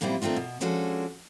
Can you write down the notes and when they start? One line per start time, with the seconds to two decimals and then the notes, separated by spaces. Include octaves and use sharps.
0.01 F#2 A#2 G3 C4 E4 F4
0.22 D#3 A3 C4 D4 F4
0.36 B2
0.60 F3 G#3 C#4 D4 F#4 A4